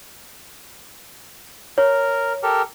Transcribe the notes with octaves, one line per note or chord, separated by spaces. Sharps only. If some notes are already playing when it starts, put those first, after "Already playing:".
A#4 C#5
G4 A4 A#4